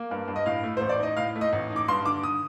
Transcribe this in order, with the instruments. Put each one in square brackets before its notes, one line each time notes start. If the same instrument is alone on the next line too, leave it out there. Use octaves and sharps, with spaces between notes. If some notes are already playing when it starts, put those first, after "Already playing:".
Already playing: [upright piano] A#3
G2
G2
D#5
A2 F5
A3
A1 C5
D5
D#4 D#5
A2 F5
A3
D#5
A1
D#4
D6
G2 C6
D3 D6
D#6